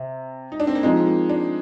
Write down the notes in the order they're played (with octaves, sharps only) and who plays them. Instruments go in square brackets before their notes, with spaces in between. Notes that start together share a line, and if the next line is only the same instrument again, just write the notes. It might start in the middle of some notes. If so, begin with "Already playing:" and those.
Already playing: [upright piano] C3
[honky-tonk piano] D#4
D4
C4
A#3
[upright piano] F3 C4 D#4 [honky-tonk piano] G#3
[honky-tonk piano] A#3
D4